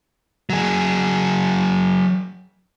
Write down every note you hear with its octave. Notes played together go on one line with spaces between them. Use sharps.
F#3 G#4